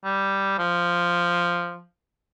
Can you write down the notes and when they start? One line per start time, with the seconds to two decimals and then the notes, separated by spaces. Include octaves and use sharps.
0.04 G3
0.59 F3